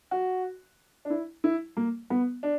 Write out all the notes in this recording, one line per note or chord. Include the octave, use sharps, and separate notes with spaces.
F#4
D4
E4
E4
A#3
B3
D4